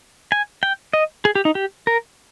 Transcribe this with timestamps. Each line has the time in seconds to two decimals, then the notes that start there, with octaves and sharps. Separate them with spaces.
0.32 G#5
0.63 G5
0.93 D#5
1.25 G#4
1.35 G4
1.45 D#4
1.55 G4
1.87 A#4